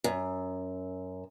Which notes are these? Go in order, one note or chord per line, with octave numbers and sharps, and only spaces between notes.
F#2